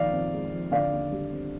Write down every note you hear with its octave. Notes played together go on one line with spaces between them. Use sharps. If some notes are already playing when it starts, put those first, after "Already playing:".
Already playing: A#1 D#3 D5 F5
F2
G#3
F2
D3 D5 F5
D#2
G3
C4